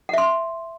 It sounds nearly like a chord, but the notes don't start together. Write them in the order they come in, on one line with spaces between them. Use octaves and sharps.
F#5 E5 C6